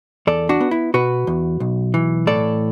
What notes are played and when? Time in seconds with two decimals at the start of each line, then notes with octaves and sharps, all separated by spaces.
0.27 E2 A4 D5
0.49 D4 F#4
0.60 B3
0.71 E4
0.94 B2 F#4 B4
1.27 E2
1.60 B1
1.94 E3
2.27 A2 A4 D5